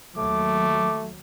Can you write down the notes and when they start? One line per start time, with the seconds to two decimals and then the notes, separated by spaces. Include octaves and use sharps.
0.17 D#2 F#3 A3 D6